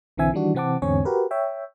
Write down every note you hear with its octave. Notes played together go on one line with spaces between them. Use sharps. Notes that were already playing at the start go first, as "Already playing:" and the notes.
B1 D3 E3 C4 E5 G#5
D#3 E3 G3 D4 F#4
C3 E3 C4 F#5 A5 D6
E2 G#2 D3 C4 C#5 G#5
F#4 G4 A#4 B4
C#5 E5 G5